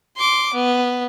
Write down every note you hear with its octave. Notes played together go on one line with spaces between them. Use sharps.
C6 D6
B3